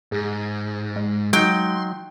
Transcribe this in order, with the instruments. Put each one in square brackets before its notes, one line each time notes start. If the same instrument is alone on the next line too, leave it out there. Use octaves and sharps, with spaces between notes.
[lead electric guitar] G#2 [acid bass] G#4
[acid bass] G#3
[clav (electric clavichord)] F#3 D#4 [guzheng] G5 [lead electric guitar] C6